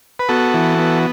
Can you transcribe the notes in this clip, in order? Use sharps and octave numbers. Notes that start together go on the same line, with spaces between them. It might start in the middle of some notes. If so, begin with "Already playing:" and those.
B4
B3 F#4 A4
E3
B3